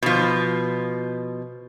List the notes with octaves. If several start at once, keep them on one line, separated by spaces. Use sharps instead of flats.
B2 F3